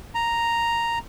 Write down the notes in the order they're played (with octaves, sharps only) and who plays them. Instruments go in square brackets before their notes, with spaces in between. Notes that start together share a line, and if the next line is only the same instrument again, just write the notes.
[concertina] A#5